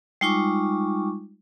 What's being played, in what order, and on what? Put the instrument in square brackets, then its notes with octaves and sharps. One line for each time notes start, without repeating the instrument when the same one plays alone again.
[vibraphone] G3 G#3 D#4 F4 C#6 D6